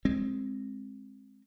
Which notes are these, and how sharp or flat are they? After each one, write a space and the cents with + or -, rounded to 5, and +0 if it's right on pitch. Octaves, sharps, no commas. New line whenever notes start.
G#3 +0 C4 +15